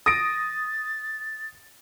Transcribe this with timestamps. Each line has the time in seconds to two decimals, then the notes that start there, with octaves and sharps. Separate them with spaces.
0.06 D#6 A6 A#6 D7